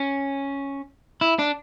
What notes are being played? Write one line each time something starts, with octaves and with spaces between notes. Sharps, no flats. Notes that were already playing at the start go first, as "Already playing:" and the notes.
Already playing: C#4
E4
D4